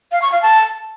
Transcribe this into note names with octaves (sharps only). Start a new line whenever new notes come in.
F5
C#6
F5
A5